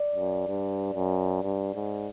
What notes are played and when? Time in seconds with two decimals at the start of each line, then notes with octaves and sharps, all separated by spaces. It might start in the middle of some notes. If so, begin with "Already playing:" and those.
Already playing: D5
0.16 F#2
0.48 G2
0.94 F#2
1.43 G2
1.75 G#2